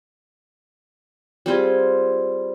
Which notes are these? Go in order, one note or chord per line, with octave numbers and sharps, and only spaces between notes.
G3 C4 F4 G#4